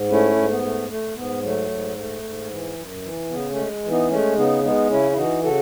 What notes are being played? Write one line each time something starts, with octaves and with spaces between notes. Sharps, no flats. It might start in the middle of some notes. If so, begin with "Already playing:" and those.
Already playing: G#2
A3 C#4 E4
G#2
B3
A3
A3
G#2 B3
F#3 A3
G#2
A3
G#2
E3
F#2
E3
C#3 B3
A3 C#4
G#3
E3
B3 D#4
G#3 A3 C#4
C#3 B3 D#4
G#3 B3 D#4
C#3 C#4 E4
E4
E3 D#4 F#4
C#3 F#4 A4